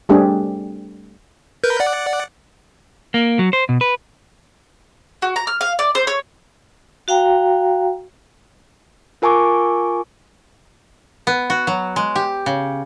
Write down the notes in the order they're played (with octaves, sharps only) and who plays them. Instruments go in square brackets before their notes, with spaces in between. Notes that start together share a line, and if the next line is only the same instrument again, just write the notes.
[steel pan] G3 A3 C4 D4 G4 G#4
[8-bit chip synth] A#4 B4 G6
D5 F#5
[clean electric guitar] A#3
F#3
C5
B2
B4
[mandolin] F#4
A#5
F6
F5
D5
C5
C#5
[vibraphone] F#4 F5 G5 A#5
[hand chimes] F4 A#4 G#5 A5 C#6 D6
[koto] B3
F#4
F#3
G#3
G4
C#3